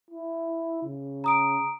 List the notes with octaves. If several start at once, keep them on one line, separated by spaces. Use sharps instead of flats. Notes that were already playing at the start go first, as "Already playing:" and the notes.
E4
C#3
A#5 D#6 D7